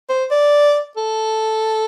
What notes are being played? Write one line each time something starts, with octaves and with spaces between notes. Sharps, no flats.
C5
D5
A4